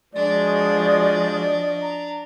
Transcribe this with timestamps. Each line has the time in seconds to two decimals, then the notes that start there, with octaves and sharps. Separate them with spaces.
0.15 F3 G#3 D4 F#4 D5 D#5
1.82 A#5